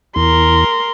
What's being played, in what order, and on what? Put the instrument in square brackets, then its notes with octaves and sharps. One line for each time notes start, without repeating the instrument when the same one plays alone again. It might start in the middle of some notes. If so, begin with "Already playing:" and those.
[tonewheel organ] E2 [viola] A#4 C6